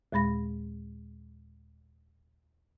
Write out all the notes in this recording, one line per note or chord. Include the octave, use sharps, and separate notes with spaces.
D#2 A#2 G#3 B5 A#6